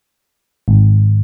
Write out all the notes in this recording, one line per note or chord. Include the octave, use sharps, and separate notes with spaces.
G#1